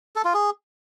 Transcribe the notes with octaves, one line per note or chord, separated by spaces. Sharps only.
A4
F4
G#4